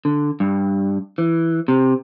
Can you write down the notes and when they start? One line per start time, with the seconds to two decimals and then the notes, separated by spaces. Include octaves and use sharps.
0.05 D3
0.40 G2
1.18 E3
1.68 C3